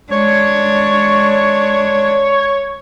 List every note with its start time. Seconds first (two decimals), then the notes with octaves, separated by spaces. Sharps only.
0.12 G#3 D4 C#5